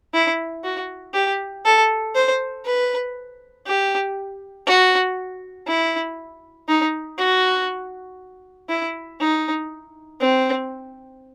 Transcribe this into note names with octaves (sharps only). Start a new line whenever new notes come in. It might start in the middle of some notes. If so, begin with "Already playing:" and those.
E4
F#4
G4
A4
C5
B4
G4
F#4
E4
D#4
F#4
E4
D#4
C4